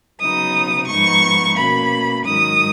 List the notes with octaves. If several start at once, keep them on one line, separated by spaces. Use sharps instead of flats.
C#3 F#3 B3 D#4 D#6
G#2 F3 B3 D#4 C#6
B2 A#3 C#4 B5
G#2 D#3 F#3 D#6